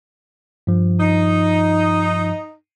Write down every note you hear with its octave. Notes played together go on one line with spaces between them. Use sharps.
G2 F3
D#4